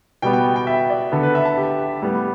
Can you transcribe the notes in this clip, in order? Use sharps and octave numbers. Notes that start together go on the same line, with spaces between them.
B2 G3 B3 G5
G5
G5
E5
D5
D3 B3 A4
B4
E5
A5
G4
A2 G3 B3